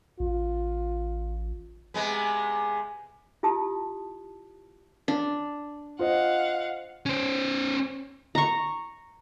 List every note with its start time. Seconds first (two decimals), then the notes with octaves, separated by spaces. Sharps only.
0.20 A1 F4
1.94 C3 G#3 B3
3.43 E4 F4 G4 A5 D#6
5.08 D4
5.99 F4 C5 D#5 F5 F#5
7.06 C#4 C5
8.35 A#5 C#6